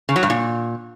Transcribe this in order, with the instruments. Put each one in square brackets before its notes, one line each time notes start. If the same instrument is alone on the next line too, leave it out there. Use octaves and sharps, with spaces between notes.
[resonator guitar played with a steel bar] C#3
F#3
G2
A#2